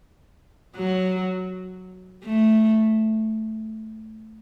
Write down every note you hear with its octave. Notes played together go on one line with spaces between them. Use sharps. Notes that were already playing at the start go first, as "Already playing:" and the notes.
F#3
A3